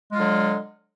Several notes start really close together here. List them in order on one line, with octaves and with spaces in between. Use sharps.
G#3 F4 F#3 D3